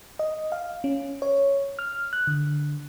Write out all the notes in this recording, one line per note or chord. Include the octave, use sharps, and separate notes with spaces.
D#5
F5
C#4
C#5
F6
F#6
D3